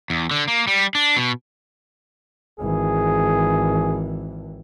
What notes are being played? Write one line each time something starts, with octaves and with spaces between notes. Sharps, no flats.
E2
D3
A#3
G3
D4
B2
G#1 E3 G#4